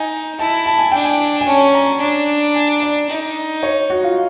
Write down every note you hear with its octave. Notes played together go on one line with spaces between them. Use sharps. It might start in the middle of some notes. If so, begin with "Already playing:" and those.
Already playing: D#4 G#5
E4 A5
A5
G#5
D4 G5
G#5
G#5
C#4 A5
A#5
D4
G#5
D5
D#4
C#5
F#4
F4